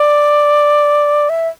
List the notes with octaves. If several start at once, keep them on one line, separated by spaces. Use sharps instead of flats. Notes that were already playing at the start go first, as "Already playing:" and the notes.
Already playing: D5
E5